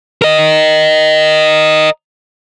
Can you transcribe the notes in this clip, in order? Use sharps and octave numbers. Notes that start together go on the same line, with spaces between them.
A#4 D#5